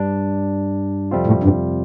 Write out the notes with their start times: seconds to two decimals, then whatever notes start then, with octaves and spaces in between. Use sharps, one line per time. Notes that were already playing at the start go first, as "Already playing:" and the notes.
Already playing: G2 G3 D4
1.11 F2 C3 G3 C4 F4
1.27 A2
1.44 G2